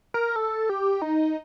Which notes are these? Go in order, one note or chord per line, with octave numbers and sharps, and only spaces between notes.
A#4
A4
G4
D#4